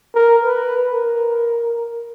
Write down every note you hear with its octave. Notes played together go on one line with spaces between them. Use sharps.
A#4
B4
A#4